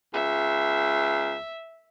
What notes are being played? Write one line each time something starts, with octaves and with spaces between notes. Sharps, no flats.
C#2 E5